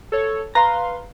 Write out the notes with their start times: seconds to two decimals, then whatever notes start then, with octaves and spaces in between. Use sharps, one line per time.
0.12 A4 C#5
0.55 B4 F5 A#5 C6